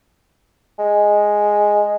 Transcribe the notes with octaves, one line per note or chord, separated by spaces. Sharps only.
G#3